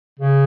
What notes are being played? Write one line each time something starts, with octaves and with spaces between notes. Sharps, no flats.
C#3